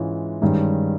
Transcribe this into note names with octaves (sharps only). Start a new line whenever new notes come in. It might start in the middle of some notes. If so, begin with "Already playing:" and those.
Already playing: G#2 E3 G#3 C#4 F4
G2 D#3 G#3 C#4